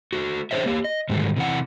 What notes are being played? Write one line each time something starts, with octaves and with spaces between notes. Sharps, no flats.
A3 F#4
D4 G#4 C5 C#5 E5
A#3 G4
D#5
G#2 D3 D#3 F#3 G3 A3
C3 E3 F#5